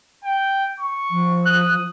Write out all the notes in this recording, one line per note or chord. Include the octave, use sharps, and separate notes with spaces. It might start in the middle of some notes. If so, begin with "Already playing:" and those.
G5
C#6
F3
D#6 F#6